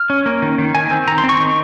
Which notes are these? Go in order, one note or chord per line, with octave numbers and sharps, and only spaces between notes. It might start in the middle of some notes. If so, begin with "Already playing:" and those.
Already playing: F6
C#4
A#3
D#3
D#3
D#3 G#5
C4
D#3 A#5
C6
C4
C#6
D#3